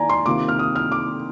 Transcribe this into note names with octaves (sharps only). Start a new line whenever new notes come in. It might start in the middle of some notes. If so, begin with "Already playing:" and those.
Already playing: D#3 A#3 D5 G#5 A#5
C6
C3 D#3 A#3 F4 D6
F6
D#6
F6
D6